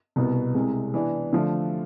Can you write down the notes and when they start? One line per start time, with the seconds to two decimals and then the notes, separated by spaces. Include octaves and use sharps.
0.16 C2 B2 B3
0.54 C2 C3 G#3
0.94 E3 B3 D4
1.33 D3 F3 A3